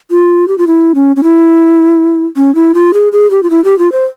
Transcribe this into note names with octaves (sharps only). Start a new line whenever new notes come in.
F4
G4
F4
E4
C#4
C#4
E4
C#4
E4
F4
G#4
G#4
G4
F4
E4
G4
F4
C5